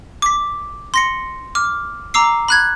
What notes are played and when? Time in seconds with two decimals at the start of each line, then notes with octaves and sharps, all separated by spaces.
0.22 D6 B6
0.94 C6 A#6 C#7
1.55 D6 F6
2.14 A#5 D6 E6 C7
2.48 B5 F#6 G#6